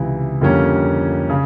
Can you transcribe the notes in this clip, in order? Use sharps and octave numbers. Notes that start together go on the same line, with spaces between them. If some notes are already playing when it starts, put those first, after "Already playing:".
Already playing: C#2 C3 E3
F2 D3 G3 A#3 C#4
C#3